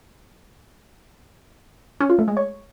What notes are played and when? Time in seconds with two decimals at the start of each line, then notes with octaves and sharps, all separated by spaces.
2.00 C#4
2.10 F4
2.19 A3
2.28 G#3
2.37 C#5